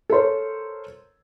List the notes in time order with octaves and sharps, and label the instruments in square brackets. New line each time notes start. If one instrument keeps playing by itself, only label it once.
[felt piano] A4 A#4 C5 C#5